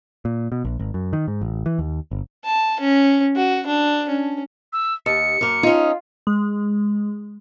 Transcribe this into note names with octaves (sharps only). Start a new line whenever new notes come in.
A#2
B2
A#1
G#1
F#2
D#3
G#2
A1
E3
D#2
G1
A5
C#4
F#4
D4
C#4
E6
D#2 C#7
F#2 A#3
C#4 D#4 F4
G#3